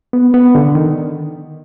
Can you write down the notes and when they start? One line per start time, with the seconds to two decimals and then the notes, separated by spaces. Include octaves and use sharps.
0.13 B3
0.34 B3
0.55 D3
0.75 D#3